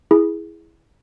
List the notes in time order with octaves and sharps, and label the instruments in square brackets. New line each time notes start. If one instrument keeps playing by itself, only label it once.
[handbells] E4 G#4